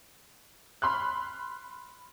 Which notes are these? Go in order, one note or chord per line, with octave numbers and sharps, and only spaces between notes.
B5 C6 F6 F#6